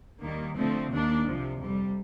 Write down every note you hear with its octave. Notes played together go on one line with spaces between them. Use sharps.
D#2 D#3 G3 A#3
D3 F3 A3 C4
D#2 D#3 A#3 D4
C2 C3 F3
F2 C3 G3